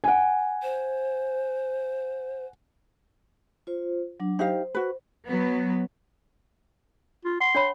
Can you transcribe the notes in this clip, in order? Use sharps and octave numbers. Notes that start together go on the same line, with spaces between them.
F#5 G#5
C5
F4 C5
F#3 D4
D#4 G4 C5 F5
F#4 B4
F#3 B3
F4
F#5 C6
D4 C#5 B5